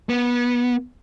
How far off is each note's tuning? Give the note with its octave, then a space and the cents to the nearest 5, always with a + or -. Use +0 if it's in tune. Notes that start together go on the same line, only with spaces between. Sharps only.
B3 -25